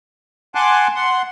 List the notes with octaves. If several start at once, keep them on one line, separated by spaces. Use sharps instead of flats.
F#5 G#5 A5 C6 D6 F#6
F#5 C6